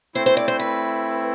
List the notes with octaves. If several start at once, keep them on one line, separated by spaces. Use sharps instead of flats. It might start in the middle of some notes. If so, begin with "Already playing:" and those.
A3 C4 E4 C5
C5
D5
C5
B4